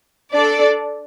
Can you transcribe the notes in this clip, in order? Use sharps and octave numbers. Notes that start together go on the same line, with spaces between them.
D4 A4 D5